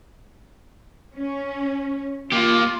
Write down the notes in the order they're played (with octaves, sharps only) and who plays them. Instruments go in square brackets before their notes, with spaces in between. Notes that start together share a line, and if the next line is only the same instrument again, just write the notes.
[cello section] C#4
[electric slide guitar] A#3 G4 [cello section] F4